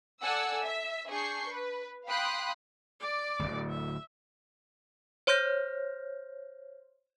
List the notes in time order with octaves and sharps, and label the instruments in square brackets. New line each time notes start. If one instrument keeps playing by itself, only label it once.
[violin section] A4 D5 F#5 G#5 E6
E5
D4 G#4 C#6 G6 C7
B4
F5 G5 B5 C6 D#6 F#6
[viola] D5 D6
[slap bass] D1 G1 D2
[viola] E5
[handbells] C5 C#5 C6 F6 G6 A#6